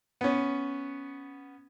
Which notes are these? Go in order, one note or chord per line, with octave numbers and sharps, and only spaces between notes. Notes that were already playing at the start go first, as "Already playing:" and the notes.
B3 C#4